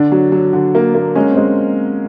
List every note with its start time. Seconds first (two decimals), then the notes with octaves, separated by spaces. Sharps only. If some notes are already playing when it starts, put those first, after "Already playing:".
Already playing: D3 D4
0.12 F#3
0.32 F#3
0.53 D3
0.75 A#3
0.95 A#3
1.15 G#3 C#4
1.31 C4
1.37 G#3